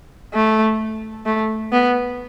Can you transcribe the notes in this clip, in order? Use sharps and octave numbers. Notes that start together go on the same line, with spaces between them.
A3
A3
B3